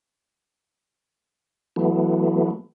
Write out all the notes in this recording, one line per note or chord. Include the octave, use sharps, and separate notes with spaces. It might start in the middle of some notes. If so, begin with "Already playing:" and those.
E3 F#3 A3 B3